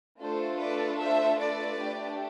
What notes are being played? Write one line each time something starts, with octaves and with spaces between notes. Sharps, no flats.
A3 D4 F4 A4 C5
B4 D5
C5 E5
B4 D5
A3 D4 G4